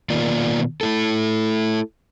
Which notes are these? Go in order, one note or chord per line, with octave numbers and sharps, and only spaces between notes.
B2 D#3 A#3 F4 D5
A3 E4 A4